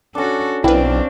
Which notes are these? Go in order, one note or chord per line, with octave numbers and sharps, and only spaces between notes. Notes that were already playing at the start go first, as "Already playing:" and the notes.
C#4 D4 F#4 A4
B1 C4 D4 E4 B4 F5 G5